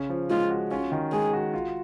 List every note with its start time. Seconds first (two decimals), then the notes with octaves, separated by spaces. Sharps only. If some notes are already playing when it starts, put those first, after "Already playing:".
Already playing: C#3 C#4
0.10 F3
0.30 G#3 F4
0.50 F#4
0.71 C#4 F4
0.92 D#3
1.12 G#3 G#4
1.33 F#4
1.54 F4